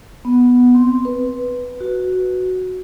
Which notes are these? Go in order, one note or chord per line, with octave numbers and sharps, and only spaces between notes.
B3
C4
B4
F#4